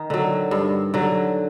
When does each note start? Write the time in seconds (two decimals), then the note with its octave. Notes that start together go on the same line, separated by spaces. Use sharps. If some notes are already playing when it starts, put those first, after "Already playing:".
Already playing: D#3 D#4
0.10 D3 F#3
0.51 G2
0.94 D3 F#3